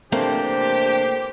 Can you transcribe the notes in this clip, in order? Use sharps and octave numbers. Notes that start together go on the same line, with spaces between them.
C3 E3 A3 A#3 C4 D4 G4 C5